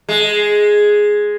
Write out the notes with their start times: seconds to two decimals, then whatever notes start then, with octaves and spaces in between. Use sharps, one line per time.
0.09 G#3